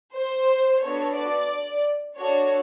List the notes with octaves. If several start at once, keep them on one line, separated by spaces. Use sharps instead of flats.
C5
B3 D4 F#4 A4 C#5
D5
D4 F#4 A4 C#5